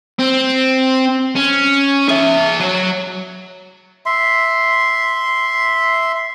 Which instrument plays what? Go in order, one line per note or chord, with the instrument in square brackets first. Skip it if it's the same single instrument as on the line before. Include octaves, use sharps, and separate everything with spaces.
[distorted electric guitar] C4
C#4
G#4 E5
F#3 C#5
[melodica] E5 C6